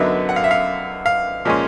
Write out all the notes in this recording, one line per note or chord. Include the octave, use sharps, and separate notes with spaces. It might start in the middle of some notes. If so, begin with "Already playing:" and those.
Already playing: F#2 D3 F#3 B3 D#4 E5
F#5
F5
E5
F5
F5
A#2 F3 G#3 C#4